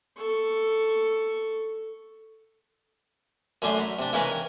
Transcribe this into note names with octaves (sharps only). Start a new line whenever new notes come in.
A4 C#6
F#2 D3 A3 D4 G#5 C6
A#5 B5
C3 D4
C#3 E3 G#3 D#4 A#4 B4
A#4